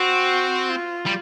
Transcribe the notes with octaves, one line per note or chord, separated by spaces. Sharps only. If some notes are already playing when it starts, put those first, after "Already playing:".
Already playing: C4 F#4
F4
G3